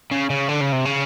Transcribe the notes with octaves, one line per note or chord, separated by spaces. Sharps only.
C#3
C#3
D3
C#3
C3
C#3